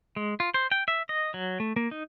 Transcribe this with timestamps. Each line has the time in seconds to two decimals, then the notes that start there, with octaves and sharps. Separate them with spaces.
0.16 G#3
0.40 F4
0.54 C5
0.72 G5
0.88 E5
1.09 D#5
1.34 F#3
1.60 A3
1.76 A#3
1.91 D#4